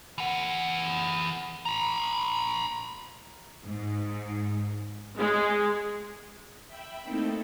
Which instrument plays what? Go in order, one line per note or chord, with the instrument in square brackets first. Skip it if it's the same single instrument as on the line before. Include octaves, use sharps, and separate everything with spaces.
[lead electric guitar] E3 F#5
A#5 B5
[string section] G#2
G#3
[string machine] E5 G5 B5
A3 A#3 C4 D#4 E4 A4